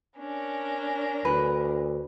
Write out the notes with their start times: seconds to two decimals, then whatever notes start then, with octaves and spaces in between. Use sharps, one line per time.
0.16 C#4 D4 A#4
1.25 D2 B4